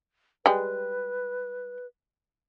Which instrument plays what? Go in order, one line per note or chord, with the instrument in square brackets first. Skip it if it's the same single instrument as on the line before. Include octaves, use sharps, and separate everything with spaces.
[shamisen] G3 G#3 [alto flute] B4